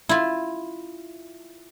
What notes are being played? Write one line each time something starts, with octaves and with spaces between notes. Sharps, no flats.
E4 F4